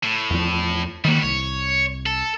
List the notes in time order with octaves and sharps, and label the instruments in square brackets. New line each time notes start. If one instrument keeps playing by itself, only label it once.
[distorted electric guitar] A2
[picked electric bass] E2 F3
[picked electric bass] D#3 A#3 [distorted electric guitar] G3 F#4
[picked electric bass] C2 [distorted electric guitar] C#5
[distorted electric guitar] A4